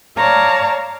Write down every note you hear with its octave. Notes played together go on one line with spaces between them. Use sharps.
C#5 D5 F5 A5 A#5